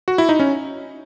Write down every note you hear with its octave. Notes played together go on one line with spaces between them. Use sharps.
F#4
E4
D#4
C#4